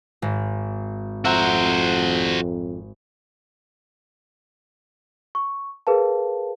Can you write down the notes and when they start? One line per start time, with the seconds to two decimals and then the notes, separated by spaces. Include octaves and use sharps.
0.22 G#1
1.25 F2 F#4 C5 E5 F#5 A#5
5.35 C#6
5.87 G#4 A#4 B4 F5 A5